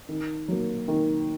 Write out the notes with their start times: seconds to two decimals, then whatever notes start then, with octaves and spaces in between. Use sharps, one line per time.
0.09 D#3
0.48 F#3 A#3
0.88 D#3